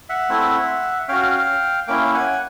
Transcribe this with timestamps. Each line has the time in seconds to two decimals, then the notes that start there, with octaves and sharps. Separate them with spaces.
0.09 E5 F#5
0.29 A3 C4 E4
1.08 C#4 F#4 F5 G5
1.88 A#3 C#4 E4 F5 G5
2.14 F#5 G#5